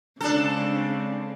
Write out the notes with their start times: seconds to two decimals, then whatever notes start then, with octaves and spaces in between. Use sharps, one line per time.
0.21 C#3 G#3 C4 D4 A4